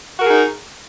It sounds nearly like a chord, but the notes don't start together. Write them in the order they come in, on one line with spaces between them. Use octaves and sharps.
F#4 A#4 G#4 D#4